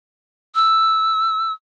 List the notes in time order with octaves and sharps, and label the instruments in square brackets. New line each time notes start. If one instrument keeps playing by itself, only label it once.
[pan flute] E6